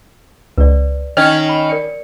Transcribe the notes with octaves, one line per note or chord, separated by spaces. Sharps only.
C#2 B4 D5
D#3 C#4 D#5 F6 G#6
B5
A#4 D5 C#7